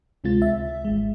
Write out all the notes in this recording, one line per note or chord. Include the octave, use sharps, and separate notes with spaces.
D2 C3 G#3 C4 F4 A6
C#2 E5
G#1 G#3